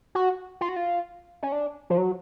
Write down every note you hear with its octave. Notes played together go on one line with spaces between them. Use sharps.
F#4
F4
F#4
F4
C#4
D4
F3
F#3